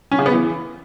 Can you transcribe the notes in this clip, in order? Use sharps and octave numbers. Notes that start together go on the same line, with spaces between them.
C#4
C#3
B3
E3